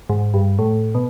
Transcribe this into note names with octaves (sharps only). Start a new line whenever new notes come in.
G#2
G2
A2
B2